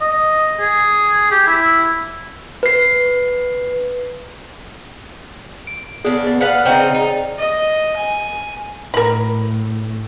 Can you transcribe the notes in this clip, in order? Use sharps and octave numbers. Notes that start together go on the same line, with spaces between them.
D#5
G#4
G4
E4
B4 C7
D7
C#3 B3 D4 G#4
D5
G#4 B4 F5 F#5
C#3 C4 D#4
D#4
D#5
G#5
A2 A#4 B5